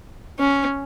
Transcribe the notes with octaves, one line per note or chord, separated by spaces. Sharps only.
C#4